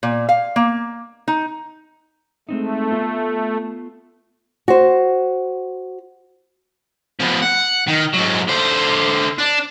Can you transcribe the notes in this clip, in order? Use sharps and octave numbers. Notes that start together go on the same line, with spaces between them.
A#2
F5
A#3
D#4
G#3 A3 C4 D#4
B3 F4 A4
F#4 C5
F3 B3
F#5
D#3
G#2 F#3
D3 C5
D4